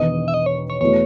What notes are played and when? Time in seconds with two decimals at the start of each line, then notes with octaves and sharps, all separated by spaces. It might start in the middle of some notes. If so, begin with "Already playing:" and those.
Already playing: E1 E2 D#3 D#5
0.28 E5
0.34 D#5
0.46 C#5
0.70 C#5
0.81 E2 B2 A3 E4 C#5